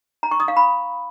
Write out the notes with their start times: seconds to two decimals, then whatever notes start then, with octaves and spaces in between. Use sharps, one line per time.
0.23 A#5
0.31 C#6
0.40 D#6
0.48 F5
0.57 B5